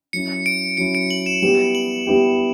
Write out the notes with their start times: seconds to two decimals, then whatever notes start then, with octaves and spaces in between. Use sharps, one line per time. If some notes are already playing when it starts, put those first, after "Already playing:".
0.13 F#3 C#4 E4 C#7
0.46 D7
0.77 F#3 C#4 E4 C#7
0.95 D7
1.11 F#7
1.26 E7
1.42 G3 B3 E4 G4 E7
1.75 F#7
2.07 G3 B3 E4 G4